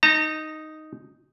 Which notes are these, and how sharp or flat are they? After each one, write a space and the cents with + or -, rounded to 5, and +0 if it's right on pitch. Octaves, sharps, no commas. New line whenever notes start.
D#4 +0 A#5 -40